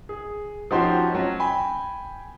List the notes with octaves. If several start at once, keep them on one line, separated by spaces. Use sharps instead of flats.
G#4
F3 C#4 D#4 F#4 G4 C5
F#3 C#4
G5 G#5 B5